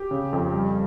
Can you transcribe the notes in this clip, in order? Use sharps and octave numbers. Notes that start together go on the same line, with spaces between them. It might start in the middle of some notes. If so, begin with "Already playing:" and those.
Already playing: G4
C#3
F2
G3